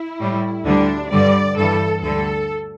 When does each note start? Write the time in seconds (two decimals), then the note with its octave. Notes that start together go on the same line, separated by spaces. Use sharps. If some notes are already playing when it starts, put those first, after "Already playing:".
Already playing: E4
0.21 A2 G3
0.65 D2 D3 G3 D4
1.11 G2 D3 G3 D5
1.57 G2 E3 G3 A4
2.02 D2 D3 G3 A4